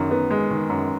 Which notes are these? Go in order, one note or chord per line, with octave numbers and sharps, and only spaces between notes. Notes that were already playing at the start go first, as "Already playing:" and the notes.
Already playing: F#2 D#3
B3
G#3
D#3
F#2